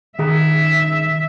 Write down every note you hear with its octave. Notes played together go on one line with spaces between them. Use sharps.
D#3 G#4 E5 A#5